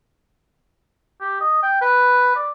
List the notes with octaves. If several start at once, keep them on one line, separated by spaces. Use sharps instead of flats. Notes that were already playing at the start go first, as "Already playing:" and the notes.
G4
D#5
G5
B4
D5